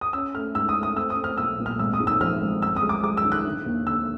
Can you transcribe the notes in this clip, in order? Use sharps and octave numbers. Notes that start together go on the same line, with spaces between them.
D#6
C#4 E6
A3 F6
G#2 E6
D#6
A3
D#6
C4 E6
D#6
C4
F6
B1 E6
A#2
F6
G#1 E6
D#6
G#2
E6
F3 F6
G#1
F#2 E6
D#6
G#3
D6
G#3 D6
E6
D#3
F#6
D3
D#2
D3 E6